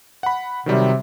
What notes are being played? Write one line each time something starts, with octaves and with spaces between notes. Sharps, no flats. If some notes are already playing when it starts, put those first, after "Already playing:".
F#5 B5
C3 D#3 F#3 G3